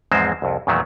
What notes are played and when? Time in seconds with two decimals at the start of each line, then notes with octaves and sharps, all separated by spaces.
0.11 E2 G#2 F3 G#3 C4 C5
0.42 C2 F2
0.67 E2 A#2 D#3 F#3 A3